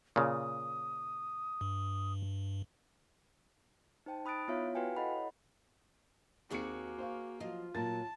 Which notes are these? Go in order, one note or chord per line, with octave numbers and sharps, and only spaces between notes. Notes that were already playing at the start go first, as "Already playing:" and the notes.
A#2 C#3 D#6
G2
D#4 C5 G5 A5
D#4 B5 D#6 F#6 A6 D7
B3 E4 F4 C#5 E5 F5
E4 F#4 B4 F5 G5 G#5
E4 A4 D#5 F#5 B5
C#5
D#2 A#3 C4 F#4 G#4 D5 C#7
C5 F5 C#6
F3 F#3 F4 D#5
A#2 F#3 A#4 A5 A6